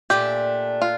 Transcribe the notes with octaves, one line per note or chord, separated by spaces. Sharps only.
A#2 A3 D4 G4
F4